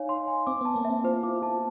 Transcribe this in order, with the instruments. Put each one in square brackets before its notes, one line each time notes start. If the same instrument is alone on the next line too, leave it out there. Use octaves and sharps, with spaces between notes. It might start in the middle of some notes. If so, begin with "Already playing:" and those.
Already playing: [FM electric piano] D#4 [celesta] C#5 F5 G#5
[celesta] C6
G#5
[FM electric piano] C4 [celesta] D6
[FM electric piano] B3
[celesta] A5
[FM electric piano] A#3
[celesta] E5
[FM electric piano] C4
[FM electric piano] F4 [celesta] C5
[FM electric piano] F4 [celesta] D6
[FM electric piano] F4 [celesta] A5